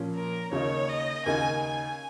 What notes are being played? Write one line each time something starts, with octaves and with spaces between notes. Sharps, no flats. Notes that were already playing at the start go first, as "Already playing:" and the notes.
Already playing: A#2 F3 C#4
A#4
D#2 C#3 A#3 D#4 C#5
D#5
D#2 C#3 A#3 D#4 G#5
G#5